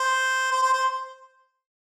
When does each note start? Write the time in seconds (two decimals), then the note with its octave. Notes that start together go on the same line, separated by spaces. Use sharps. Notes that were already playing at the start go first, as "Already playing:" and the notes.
Already playing: C5
0.51 C5
0.62 C5
0.73 C5